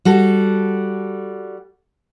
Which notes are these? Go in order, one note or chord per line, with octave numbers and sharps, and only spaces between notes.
G3 F#4 A4